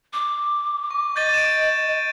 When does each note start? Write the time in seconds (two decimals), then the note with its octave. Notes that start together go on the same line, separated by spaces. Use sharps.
0.13 D6
0.91 C#6
1.16 D#5 G6 A6 D#7
1.34 D7 E7